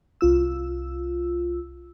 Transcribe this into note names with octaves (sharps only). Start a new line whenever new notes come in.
C2 F4 E6